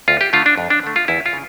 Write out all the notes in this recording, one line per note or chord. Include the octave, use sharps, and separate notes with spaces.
D2 F4
G4
D3 A3 F4
D4
F2
D4
D3 A3
F4
E2 E4
F4
C#3